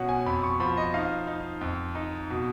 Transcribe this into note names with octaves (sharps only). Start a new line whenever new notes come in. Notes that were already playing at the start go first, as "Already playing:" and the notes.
Already playing: B2 C#4 F#5
G#5
F2 B5
C#6
F3 B5
D#5
D#4 F5
D#4
F2
D#4
B2